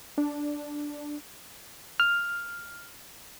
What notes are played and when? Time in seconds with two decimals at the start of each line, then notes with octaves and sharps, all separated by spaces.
0.18 D4
2.00 F6